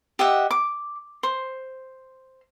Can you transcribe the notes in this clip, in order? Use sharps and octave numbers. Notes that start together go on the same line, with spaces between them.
G4 D#5 E5 F#5
D6
C5